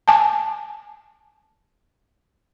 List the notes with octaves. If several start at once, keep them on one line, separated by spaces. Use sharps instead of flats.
G#5 A5